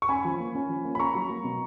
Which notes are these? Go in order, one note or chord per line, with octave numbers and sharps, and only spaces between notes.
C#6
C#4 G#5 B5
F3
A#3
C#4
F3
A#3
B5
C#4 A#5 C#6
F#3
A#3
B2